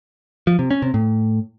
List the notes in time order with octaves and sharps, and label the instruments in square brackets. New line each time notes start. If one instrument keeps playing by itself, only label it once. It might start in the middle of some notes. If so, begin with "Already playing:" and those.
[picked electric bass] F3
C3
C#4
C3
A2